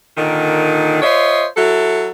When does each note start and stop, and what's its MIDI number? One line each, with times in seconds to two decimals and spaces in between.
0.17 1.02 46
0.17 1.02 50
0.17 1.02 51
1.02 1.46 65
1.02 1.46 72
1.02 1.46 73
1.02 1.46 75
1.02 1.46 76
1.57 2.10 54
1.57 2.10 64
1.57 2.10 69